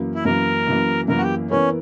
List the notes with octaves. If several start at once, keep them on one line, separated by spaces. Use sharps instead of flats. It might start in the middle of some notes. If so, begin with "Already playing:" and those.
Already playing: F#2 E3 A#3
E4
F#2 E3 A#3 A#4
F#2 E3 A#3
F#2 E3 A#3 A#4
F#4
G4
E3 B3 C#4 E4 A#4